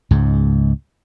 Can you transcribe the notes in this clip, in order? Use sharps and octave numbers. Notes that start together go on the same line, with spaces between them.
C#2 G#2